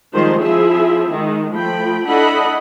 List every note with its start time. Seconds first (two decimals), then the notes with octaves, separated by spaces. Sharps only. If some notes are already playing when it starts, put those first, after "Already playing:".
0.14 D#3 F3 G3 G#3 C4 C5
0.42 F3 C4 E4 F4 G#4 E5
1.13 D#3 G#3
1.54 F3 A3 G5 B5
2.06 D4 E4 A4 D#5 F#5 B5